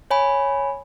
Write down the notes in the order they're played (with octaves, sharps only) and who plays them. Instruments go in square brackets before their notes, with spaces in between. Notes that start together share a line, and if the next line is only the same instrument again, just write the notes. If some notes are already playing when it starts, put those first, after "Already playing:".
[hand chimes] C#5 G#5 B5